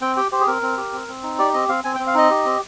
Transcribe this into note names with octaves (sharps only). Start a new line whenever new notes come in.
C4 G5
G4 G5
G4 C5
G#4
C4 A#4
C4
G4
C4
C4
D#4
G4 D5
C4 D#5
C4 F5
C4 G#5
G5
C4
F5
D#4 D#5
G4
C4